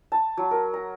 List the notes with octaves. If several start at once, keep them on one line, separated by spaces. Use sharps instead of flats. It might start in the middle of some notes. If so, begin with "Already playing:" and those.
A5
F#3
A#4
A#5